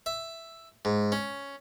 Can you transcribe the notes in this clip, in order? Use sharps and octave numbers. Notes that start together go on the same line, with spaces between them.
E5
G#2
C#4